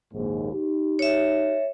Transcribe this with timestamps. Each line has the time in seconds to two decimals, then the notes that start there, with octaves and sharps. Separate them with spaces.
0.14 A#1 D#2 G#2
0.53 D#4 G4
0.99 C#5 E5